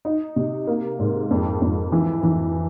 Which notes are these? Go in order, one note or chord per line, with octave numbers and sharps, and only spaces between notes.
D#4
C3
A#3
G#2
F2
F2
E3
E3